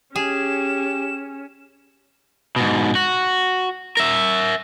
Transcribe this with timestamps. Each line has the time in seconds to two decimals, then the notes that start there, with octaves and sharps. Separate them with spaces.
0.16 C#4 G4 G#4 E7
2.56 G#2 B2
2.95 F#4
3.97 A#4 E5